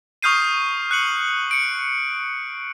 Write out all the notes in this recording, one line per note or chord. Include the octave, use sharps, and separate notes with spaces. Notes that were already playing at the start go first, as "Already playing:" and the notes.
C#6 D#6 F6 G6 C7 D#7
F#6 C#7 F#7
C#7 D7